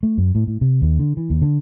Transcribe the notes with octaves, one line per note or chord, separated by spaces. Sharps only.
A3
F#2
A2
A2
C3
D#2
D3
E3
D#2
D3